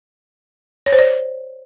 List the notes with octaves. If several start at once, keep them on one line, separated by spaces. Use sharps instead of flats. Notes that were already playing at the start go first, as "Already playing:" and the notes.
C#5
C5
D5